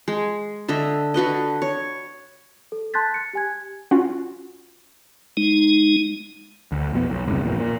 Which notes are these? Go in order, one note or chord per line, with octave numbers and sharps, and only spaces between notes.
G#3
D3 D#5 E5
D3 F#4 B4 D#5
C#5
A4
A5 C6 F#6 G6 A6 B6
F#6 C#7
G4 G#5 G#6
C#4 F4 F#4
G#3 D#4
D2
B1 F2 E3 B3
B1
F1 C#2 G2 C3
A#1 E2 A#2
A#2